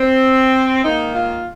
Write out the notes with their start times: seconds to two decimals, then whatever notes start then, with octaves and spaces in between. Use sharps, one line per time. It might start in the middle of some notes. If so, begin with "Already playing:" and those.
Already playing: C4
0.82 G#2 D#3 A#3 D#4
1.13 F4